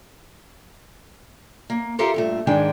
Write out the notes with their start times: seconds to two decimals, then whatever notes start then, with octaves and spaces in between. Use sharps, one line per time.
1.70 A#3
1.99 F4 G4 A4 A#4 E5 F5
2.14 G2 A#2 A3
2.47 G#2 D#3 G#3 D4 G5 G#5